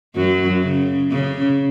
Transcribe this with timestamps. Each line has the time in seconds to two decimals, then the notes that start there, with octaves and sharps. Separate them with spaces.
0.15 F#2 F#3
0.63 C#3
1.11 C#3